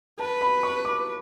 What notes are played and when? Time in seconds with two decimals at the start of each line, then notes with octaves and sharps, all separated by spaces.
0.19 B4 A5
0.41 B5
0.63 C#6
0.85 D6